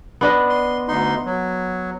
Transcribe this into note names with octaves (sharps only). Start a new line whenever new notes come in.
B3 D4 D#5
C6
D2 D#4 C6
F#3